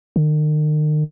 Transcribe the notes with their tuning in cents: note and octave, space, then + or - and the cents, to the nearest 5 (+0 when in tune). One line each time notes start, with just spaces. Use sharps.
D#3 -40